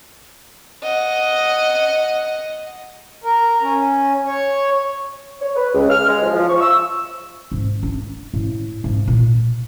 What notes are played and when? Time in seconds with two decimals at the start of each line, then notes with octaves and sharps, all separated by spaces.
0.83 D#5 F#5
3.24 A#4
3.61 C#4
4.26 C#5
5.41 C#5
5.56 B4
5.74 C#2
5.90 F6
6.08 G#3
6.23 F3
6.36 F3
6.49 C#6
6.61 E6
7.52 G#2
7.83 D4
8.34 A2
8.84 G#2
9.07 A#2